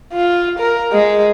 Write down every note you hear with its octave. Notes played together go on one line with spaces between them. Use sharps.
F4
A#4
G#3